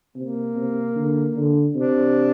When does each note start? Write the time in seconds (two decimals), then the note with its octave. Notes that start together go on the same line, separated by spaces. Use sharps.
0.16 C3 A#3
0.56 C3
0.96 D3
1.36 D3
1.76 C3 D4